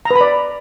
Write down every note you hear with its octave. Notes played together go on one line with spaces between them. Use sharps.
A#5
B4
B5
D5